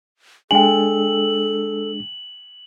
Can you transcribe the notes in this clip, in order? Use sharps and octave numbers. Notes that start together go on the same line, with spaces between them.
G#3 D4 G#4 A4 G5 G#5 F#7